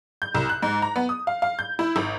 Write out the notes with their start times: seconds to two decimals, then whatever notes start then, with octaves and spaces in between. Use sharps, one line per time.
0.22 G6
0.35 C2
0.49 F#6
0.63 G#2
0.82 A#5
0.96 B3
1.09 D#6
1.27 F5
1.42 F5
1.59 G6
1.79 E4
1.96 G#1